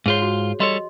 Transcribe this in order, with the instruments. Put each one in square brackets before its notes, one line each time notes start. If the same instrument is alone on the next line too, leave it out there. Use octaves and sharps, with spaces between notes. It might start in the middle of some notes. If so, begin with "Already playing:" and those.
[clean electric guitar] G#2 F4 C6 [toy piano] G#4 C5 C#5
[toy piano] F#4
[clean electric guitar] G3 A4 C#5 [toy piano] D#5 C6